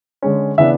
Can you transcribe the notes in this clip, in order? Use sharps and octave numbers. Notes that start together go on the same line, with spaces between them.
D3 G#3 C#4
C#3 E3 B3 D4 E5